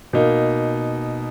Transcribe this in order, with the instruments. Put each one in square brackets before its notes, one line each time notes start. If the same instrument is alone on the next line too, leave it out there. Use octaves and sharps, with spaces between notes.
[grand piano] B2 A#3 D#4